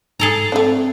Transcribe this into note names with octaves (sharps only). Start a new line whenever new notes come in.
G#2 G#4 A4 A#5
A3 C4 D4